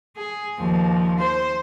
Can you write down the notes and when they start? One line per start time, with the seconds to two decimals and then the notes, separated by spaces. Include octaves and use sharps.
0.17 G#4
0.58 D#2 F3
1.19 C5